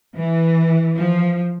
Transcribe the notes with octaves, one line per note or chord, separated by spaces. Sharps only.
E3
F3